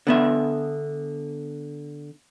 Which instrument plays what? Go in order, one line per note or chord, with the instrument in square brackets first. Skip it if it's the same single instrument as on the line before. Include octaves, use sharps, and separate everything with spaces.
[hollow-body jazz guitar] D3 B3 E5